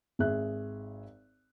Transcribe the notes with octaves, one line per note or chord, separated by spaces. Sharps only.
G#1 G#4 E5 F#6